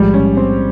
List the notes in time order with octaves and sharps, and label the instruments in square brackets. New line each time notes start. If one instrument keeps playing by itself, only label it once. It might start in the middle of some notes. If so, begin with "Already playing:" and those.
Already playing: [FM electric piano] B1 A2 F3 G#3 [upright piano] G3
[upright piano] C#4
C4